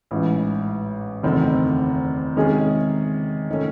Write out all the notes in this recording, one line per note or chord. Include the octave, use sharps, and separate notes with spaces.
A1 G#2 E3
F#1 E2 D#3 A3 C4
C3 D#3 G#3 C#4 G#4
D#3 A3 C#4